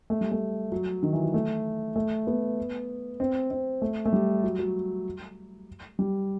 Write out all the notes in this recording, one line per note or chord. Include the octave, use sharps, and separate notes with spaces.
A3
G3
A3
F#3
D#3
E3
F#3
A3
A3
B3
C4
C4
A3
A3
G3
F#3
F#3
G3